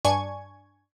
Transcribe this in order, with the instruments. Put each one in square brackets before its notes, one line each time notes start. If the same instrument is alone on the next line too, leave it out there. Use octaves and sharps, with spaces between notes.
[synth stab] G2 D4 G#5 C#6 G#6